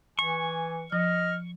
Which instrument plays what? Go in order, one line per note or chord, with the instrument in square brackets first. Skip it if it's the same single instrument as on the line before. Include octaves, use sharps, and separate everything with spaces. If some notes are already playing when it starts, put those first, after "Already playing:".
[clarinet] E3 [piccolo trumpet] G#5 [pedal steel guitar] C#6
[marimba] F3 [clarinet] D#5 [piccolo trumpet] F6